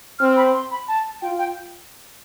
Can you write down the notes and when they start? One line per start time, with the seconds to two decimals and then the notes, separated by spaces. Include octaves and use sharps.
0.19 C4 F6
0.36 B5
0.54 C6
0.71 B5
0.88 A5
1.22 F4 G5
1.39 G5